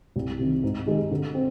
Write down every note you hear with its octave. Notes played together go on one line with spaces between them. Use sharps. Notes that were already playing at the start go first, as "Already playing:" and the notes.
C2
C3 D#3
G#2
D#3 G#3 D#4 G4
D3
C4